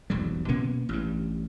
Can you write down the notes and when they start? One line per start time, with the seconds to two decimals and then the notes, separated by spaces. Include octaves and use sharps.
0.10 E1 B1 F2 G3
0.48 B2 A#3 B3 C#4
0.89 A1 G2